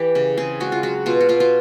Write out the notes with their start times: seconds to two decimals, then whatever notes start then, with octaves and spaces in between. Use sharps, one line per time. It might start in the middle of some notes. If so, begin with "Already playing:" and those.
Already playing: E3 G4
0.15 C#3
0.37 C4 G#4
0.60 G#3 F#4
0.72 F4
0.83 F#3 F#4
1.06 B2 F4
1.21 F#4
1.29 B2 F4
1.40 F4